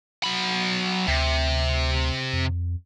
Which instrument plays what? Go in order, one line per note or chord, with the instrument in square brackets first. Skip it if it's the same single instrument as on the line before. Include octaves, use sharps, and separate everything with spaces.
[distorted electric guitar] F#3 B5
[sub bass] D2 [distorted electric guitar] C3
[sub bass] F2